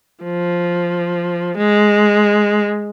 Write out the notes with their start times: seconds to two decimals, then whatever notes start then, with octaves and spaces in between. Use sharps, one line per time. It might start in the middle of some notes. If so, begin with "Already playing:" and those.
0.24 F3
1.57 G#3